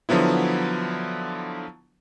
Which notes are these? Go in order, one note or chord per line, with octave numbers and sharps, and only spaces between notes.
D3 F3 F#3 B3 E4